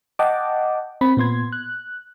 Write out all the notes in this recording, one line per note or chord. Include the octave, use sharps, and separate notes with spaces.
D#5 F#5 G5 A5 D6
C4 B5
A#2 B3 C6 G#6
F#6